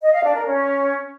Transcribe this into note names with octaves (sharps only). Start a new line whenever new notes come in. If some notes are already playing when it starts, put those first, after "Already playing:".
D#5
F5
D4
A#4
C#4